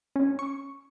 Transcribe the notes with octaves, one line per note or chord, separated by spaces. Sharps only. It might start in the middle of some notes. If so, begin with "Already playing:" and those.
C#4
C#6